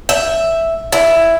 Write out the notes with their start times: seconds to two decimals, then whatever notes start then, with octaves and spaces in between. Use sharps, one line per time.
0.09 E5
0.92 E4